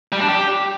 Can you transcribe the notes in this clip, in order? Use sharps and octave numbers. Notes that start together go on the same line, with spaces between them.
G3
D4
G4